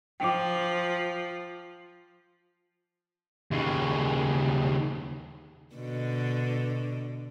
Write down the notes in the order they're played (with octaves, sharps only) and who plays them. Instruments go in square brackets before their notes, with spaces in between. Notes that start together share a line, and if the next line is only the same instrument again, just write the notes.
[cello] F3 [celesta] G5 D6
[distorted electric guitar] D#2 C#3
[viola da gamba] B2 D3